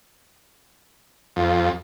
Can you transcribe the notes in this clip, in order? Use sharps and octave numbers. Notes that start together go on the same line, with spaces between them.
F2